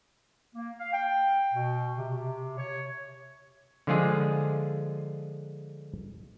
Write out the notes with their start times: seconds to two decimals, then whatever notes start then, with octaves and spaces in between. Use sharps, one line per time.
0.55 A#3
0.79 F5
0.93 G5
1.54 B2
1.98 C3
2.13 C3
2.58 C#5
3.87 D3 F3 G#3 F4 G#4